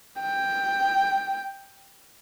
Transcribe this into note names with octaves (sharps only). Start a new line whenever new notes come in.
G5